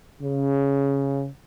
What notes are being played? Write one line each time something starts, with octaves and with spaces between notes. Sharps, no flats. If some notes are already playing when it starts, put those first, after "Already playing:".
C#3